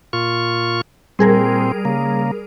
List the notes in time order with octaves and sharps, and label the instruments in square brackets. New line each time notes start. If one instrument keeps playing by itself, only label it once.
[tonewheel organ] A#2 F4 C#6
[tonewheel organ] A#2 C4 [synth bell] G3 G#4 A#4
[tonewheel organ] C#3 A#3